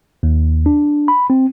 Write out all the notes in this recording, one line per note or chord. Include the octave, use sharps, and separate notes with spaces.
D#2
D4
B5
C4